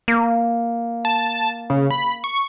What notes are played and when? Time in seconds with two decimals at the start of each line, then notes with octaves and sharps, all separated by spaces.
0.08 A#3
1.05 A5
1.70 C#3
1.91 B5
2.24 C#6